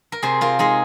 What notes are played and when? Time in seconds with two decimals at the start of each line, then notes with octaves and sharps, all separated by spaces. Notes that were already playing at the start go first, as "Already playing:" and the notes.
0.12 A#4
0.23 C3 G#4 C5
0.41 F4 A#4
0.59 G#3 D#4 G#4